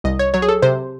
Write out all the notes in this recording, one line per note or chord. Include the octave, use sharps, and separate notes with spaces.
C2 D#5
C#5
F#3 C#5
G#4
A4
C3 C5